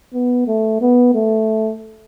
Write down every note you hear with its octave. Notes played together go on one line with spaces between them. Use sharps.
B3
A3
B3
A3